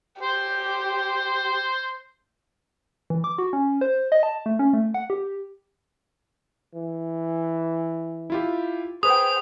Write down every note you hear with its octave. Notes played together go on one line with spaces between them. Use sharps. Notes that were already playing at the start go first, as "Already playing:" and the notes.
G4 C5
E3
D6
F#4
C#4
C5
D#5
A5
A3
C#4
A3
F#5
G4
E3
E4 F4 G4
G#4 B4 C5 G5 D#6